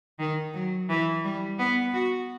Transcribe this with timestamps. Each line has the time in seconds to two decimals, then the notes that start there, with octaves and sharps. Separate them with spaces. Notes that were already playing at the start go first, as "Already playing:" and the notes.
0.19 D#3
0.53 F#3
0.89 E3
1.24 G3
1.59 B3
1.94 F#4